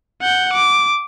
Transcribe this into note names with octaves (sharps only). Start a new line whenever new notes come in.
F#5 G6
D6